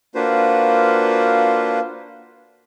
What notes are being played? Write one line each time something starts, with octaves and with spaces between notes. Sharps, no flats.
A#3 D4 F4 F#4 B4 C5